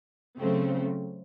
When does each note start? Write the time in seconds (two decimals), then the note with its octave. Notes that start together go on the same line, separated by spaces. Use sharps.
0.38 C#3 F#3 A3 C4